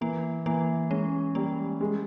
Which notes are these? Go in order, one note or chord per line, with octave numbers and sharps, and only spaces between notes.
E3 A#3
E3 A#3
G#3 C#4
G3 A#3
G#3